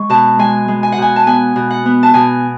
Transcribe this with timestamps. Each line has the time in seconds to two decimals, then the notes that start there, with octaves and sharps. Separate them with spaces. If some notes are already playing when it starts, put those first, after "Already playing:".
Already playing: G#3 C#6
0.09 B2 A5
0.39 G#3 G#5
0.68 G#3
0.83 G#5
0.92 F#5
0.98 B2 G#5
1.16 A5
1.26 B3 G#5
1.56 B2
1.71 F#5
1.86 B3
2.03 A5
2.14 B2 G#5